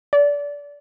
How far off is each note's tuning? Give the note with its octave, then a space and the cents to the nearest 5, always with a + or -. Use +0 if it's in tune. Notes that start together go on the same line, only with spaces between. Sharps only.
D5 -25